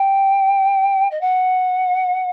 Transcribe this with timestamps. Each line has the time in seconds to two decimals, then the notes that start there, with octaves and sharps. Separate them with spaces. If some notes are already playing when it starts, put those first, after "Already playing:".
Already playing: G5
1.11 D#5
1.21 F#5